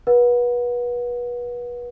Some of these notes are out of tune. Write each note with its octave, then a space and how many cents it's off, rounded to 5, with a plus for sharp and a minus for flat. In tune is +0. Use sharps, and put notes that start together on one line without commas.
B4 -30 F#5 -25